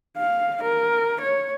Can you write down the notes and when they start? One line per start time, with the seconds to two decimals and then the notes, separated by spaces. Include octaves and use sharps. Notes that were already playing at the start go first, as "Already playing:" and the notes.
0.18 F5
0.63 A#4
1.21 C#5